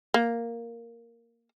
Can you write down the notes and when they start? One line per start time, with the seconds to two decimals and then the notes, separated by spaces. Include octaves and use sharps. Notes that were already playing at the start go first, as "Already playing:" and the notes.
0.14 A#3